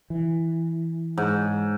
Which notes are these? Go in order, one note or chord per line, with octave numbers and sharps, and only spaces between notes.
E3
G#2